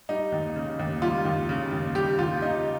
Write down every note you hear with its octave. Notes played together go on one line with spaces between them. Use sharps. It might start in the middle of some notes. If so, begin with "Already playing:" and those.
G3 D#4
D#2
C#3
D#2
G3 F4
D#2
C#3
D#2
G3 G4
D#2 F4
C#3 D#4